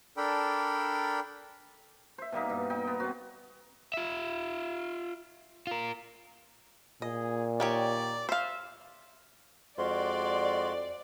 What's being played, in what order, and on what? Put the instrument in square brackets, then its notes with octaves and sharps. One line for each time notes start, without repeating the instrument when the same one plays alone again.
[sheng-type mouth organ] D4 A4 A#4 D5 G5 B5
[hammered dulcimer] C5 E5
B2 G3 A#3 D#4
G2
D#4 G5
B3
C4 F#4
[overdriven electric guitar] F4 E5
F4 A#4
[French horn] A#2 [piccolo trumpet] G#4 [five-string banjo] D#5
[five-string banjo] D#3 G4 C#5 [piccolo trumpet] D5
[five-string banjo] C5 F5 [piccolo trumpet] E5
[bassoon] F2 [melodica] G#3 F#4 C6 [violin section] D5